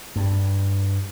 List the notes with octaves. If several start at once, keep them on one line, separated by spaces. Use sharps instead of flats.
G2